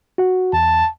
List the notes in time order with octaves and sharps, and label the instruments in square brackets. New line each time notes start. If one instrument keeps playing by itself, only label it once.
[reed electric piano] F#4 F#5
[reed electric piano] E2 [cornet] A5